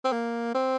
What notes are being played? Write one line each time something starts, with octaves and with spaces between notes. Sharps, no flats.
C4
A#3
C4